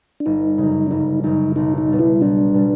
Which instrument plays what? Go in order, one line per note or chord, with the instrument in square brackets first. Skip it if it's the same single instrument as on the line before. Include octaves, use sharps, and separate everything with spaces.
[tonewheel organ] D4
[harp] G1 [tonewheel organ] D#4
[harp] F#2 C#3
[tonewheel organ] D4
[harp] G1 [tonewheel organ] D#4
[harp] F#2 C#3 [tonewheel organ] D#4
[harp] B1 [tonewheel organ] D#4
[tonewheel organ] D#4
[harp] B2 G3
[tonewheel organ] E4
[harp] B1 [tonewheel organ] D4
[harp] B2 G3